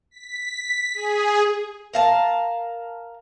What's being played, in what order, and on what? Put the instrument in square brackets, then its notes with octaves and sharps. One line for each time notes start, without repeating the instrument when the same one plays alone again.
[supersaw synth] B6
G#4
[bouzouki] A#4 F5 A5